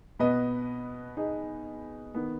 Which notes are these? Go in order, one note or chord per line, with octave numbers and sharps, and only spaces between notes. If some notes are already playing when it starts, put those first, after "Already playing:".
B2 B3 B4 D#5
D#4 G#4
D#3 B3